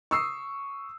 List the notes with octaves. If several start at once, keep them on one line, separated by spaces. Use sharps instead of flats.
C#6 D#6 E6 C7